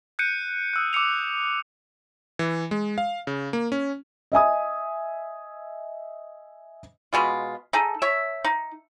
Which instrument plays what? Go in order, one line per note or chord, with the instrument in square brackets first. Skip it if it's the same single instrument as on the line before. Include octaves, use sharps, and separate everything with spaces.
[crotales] F#6 G6 C#7 D#7
D#6 E6 F#6
D6 E6 C#7 F7
[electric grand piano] E3
G#3
F5
C#3
A#3
C#4
[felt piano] D#5 E5 G#5 D#6
[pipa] B2 G#3 F4
D#4 G#4 A4
C#5 E5
D#4